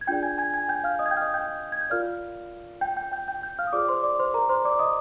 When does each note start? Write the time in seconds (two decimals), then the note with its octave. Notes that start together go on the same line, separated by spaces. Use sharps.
0.01 G#6
0.07 D4 F4 G#4 D5 G5 G6
0.23 G#5 G#6
0.38 G#5 G#6
0.54 G#5 G#6
0.68 G5 G6
0.84 F5 F6
0.99 D#5 D#6
1.06 G#6
1.11 G5 G6
1.17 F6
1.21 D#5 D#6
1.34 G5 G6
1.72 G#6
1.81 G6
1.90 F4 A#4 D5 F5 F6
2.81 G5 G6
2.97 G5 G6
3.12 G5 G6
3.28 G5 G6
3.42 G5 G6
3.59 F5 F6
3.67 D#6
3.73 F4 G#4 C5 D5 D6
3.89 C5 C6
4.03 D5 D6
4.19 C5 C6
4.34 A#4 A#5
4.49 C5 C6
4.65 D5 D6
4.79 D#5 D#6